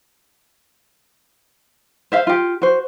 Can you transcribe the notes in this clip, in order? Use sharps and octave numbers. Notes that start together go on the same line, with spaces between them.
C5 E5 F5
F4 G4
F#4 C5